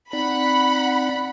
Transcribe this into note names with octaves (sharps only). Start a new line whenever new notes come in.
C4 D#4 D5 F#5 B5